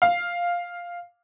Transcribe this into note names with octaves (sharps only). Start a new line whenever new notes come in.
F5